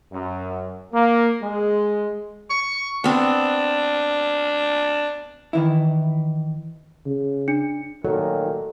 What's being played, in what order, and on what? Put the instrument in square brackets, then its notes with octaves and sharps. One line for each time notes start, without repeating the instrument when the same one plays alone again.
[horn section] F#2
A#3
G#3
[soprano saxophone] C#6
[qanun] B3 C4 [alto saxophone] D4
[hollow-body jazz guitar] D#3 E3 E4
[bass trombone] C#3
[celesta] D4 C#7
[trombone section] A#2 D#3 [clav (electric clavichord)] F#3 [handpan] A4